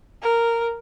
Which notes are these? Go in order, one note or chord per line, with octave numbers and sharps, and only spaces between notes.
A#4